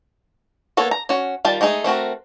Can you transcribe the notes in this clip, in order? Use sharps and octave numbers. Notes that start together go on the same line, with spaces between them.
A#3 B3 A4 C#5
A#5
C#4 F#4
D#3 G3 F4 A5
G#3 A3 D#4 G#4
A3 C4 F#4 A#4